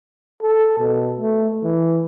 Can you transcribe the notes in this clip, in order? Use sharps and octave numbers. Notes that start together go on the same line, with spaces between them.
A4
B2
A3
E3